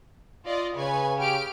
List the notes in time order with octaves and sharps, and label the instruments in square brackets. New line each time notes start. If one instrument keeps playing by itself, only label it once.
[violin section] F4 D5 D#5
[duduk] C#3 [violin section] B4 C#5 G#5
[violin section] G4 F6 D7